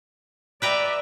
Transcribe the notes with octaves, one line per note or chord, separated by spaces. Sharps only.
B4 D5 E5 G5 A#5